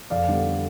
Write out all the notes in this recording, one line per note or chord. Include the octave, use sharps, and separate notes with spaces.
F2 D5 F5
D3 G3 B3